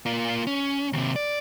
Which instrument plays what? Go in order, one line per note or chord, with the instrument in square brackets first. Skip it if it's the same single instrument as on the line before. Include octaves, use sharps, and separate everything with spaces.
[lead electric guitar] A#3 F4
C#4
D#2 C3
D5